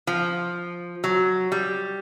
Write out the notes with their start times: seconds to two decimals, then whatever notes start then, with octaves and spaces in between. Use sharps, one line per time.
0.07 F3
1.04 F#3
1.52 G3